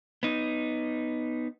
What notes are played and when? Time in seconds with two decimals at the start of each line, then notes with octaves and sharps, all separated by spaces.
0.23 B3 D#4